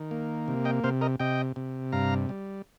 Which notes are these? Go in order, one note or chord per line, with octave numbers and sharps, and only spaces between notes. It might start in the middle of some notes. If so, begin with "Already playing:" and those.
Already playing: D#3
A#3
C3
D#5 G5
C3 C5 F5
A#4 D#5
C3 D#5 G5
C3
G2 F5 A#5
G3